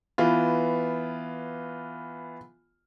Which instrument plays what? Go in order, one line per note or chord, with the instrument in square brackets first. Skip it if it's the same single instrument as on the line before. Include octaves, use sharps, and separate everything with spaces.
[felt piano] E3 B3 F4